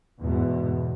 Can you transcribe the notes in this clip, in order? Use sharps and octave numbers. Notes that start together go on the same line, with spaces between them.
E2 G#2 B2